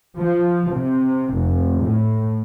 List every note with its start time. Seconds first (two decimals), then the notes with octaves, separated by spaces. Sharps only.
0.19 F3
0.73 C3
1.35 F1
1.82 A2